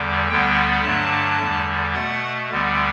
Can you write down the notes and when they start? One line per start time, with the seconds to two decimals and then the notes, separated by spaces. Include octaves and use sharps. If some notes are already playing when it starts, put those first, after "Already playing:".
Already playing: E2 D3 G3
0.29 D2 D3 G3 B3 G5
0.84 G2 D3 F#3 A3 A5
1.40 E2 D3 G3
1.94 B2 A3 F#5
2.50 D2 D3 G3 B3